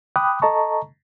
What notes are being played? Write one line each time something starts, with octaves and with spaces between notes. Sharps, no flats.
G5 B5 D6 D#6 F#6
A4 D#5 A5 A#5 C#6